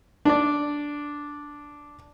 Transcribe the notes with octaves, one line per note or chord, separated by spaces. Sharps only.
D4 D5